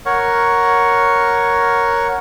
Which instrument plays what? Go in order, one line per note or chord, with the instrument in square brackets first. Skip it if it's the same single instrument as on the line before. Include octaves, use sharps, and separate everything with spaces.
[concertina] A#4 C#5 F#5 C#6